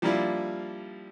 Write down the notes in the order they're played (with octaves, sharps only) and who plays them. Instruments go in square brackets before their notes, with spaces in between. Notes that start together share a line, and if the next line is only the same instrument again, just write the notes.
[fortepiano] F3 G3 A#3 D4 E4 F4